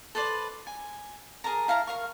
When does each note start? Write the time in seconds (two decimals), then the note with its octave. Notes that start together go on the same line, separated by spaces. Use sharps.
0.15 A4 B4 C5 D5
0.67 G#5
1.44 G#4 A#4 A5 A#5
1.68 E4 F5 A5 A#5
1.87 A#4 F5 C#6